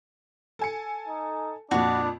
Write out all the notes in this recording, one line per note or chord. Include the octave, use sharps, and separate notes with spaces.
A4 G#5 C#7
D#4
F2 A#2 D4 F#4 D5